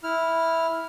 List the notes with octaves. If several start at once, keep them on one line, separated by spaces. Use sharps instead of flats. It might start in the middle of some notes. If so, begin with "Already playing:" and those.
E4 F6